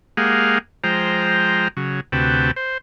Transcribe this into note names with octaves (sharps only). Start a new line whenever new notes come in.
G#3 A#3 G4 G#4 F5 F#5
F3 G#3 C5 G5 A#5
C#3 F#3
D2 C3 F#4 B4 G5 A5
C5